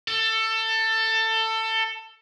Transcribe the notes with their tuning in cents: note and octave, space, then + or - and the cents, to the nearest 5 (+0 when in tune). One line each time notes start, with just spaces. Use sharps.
A4 +20